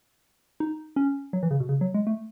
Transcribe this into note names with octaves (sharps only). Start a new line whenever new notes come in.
D#4
C#4
F#3
E3
C#3
B2
C#3
F#3
G#3
A3